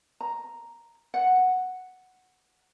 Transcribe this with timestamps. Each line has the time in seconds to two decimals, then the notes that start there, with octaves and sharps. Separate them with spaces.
0.21 A#5
1.14 F#5